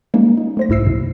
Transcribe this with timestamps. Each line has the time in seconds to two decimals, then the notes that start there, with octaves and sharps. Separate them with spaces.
0.14 G3 G#3 A#3 C#4 D#4
0.37 D#4
0.57 A3 C5 A#6
0.69 C2 G#2 E4 E6 C7
0.85 F#2 B2